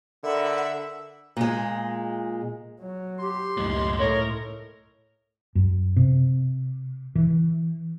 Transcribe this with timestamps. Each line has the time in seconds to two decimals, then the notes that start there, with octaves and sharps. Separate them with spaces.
0.23 D3 A#4 E5 F#5 B5
1.37 A#2 G#3
2.81 F#3
3.19 G4 C6
3.57 C#2 F#2 A2 D#4
3.99 A2 A#4 C#5
5.55 F#2
5.96 C3
7.15 E3